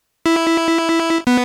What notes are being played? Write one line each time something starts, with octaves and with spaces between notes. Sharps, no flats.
E4
B3